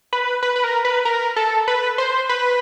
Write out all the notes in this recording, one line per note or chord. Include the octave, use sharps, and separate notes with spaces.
B4
B4
B4
A#4
B4
A#4
A4
B4
C5
B4